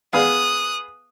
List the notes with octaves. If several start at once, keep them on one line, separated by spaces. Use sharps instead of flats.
B3 G#4 F5 D#6 F#6